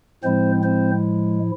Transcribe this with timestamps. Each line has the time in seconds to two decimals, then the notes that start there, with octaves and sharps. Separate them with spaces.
0.23 A2 F3 G#3 C4 E4 C5
0.63 C4 C5